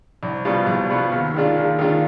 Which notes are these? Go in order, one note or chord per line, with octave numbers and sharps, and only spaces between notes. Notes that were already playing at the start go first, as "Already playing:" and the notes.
C2
B2 G3 B3 F4
C2
B2 G3 B3 F4
D#2
D#3 G#3 D4 F4
D#2
D#3 G#3 D4 F4